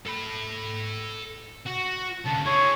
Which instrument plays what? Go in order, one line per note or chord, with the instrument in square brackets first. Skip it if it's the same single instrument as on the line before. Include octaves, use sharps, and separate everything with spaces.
[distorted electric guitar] A4 B5
F#4
[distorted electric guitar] C#2 D3 [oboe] A5
[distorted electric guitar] E4 G#4 [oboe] C#5